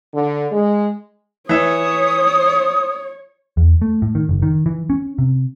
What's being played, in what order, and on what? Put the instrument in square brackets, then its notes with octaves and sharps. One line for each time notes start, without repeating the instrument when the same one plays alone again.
[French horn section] D3
G#3
[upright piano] E3 E5 [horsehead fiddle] C#5 [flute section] D#6
[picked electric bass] E2
A3
A2
D#3
F#1
D#3
E3
C#4
C3